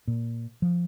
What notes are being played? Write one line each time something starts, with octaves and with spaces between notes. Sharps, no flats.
A#2
F3